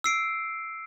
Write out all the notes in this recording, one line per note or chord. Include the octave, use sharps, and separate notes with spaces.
E6 C7 D7